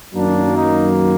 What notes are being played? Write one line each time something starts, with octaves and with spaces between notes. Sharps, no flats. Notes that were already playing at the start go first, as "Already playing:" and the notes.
F#2 D#3 F#3 A#3 D4
D#4